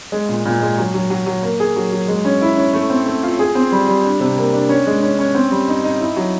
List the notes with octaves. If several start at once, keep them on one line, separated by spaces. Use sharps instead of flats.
G#3
A#2
A#2
G#3
F#3
F#3
F#3
F#3
A#3
G#4
F#3
F#3
G#3
C#4
E4
C#4
A3
C4
A3
F4
G#4
C4
G3
G3
D4
C3
A#3
D4
C#4
G#3
C#4
C#4
C4
G3
D#4
D#4
E4
F#3